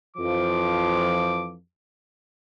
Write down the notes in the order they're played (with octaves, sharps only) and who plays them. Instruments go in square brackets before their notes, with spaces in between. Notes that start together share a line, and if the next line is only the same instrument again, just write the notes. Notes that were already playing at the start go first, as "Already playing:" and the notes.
[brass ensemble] F2 E3 F3 [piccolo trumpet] D6